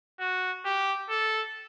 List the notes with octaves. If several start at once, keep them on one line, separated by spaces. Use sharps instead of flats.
F#4
G4
A4